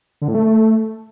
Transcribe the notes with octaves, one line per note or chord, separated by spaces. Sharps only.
D3
A2
A3